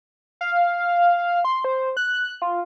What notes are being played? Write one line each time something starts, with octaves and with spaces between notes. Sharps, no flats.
F5
C6
C5
F#6
F4